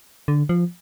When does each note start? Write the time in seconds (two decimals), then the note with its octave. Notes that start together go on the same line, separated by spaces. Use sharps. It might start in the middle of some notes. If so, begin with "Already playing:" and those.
0.28 D3
0.49 F3